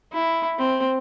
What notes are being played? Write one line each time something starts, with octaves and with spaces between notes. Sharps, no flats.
E4
C4